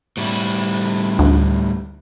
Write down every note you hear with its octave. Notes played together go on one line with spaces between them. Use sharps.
A2 G3 E4
D2